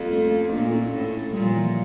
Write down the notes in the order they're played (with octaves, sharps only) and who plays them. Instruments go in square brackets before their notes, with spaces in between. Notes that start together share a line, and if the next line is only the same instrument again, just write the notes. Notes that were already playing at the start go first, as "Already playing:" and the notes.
Already playing: [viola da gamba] F2 [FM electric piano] G3 A#3
[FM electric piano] A3 C#4
[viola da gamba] A#2 [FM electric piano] A#3 D4
[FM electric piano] C#4 E4
[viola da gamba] A2
[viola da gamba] A#2 [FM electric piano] G3
[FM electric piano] F3
E3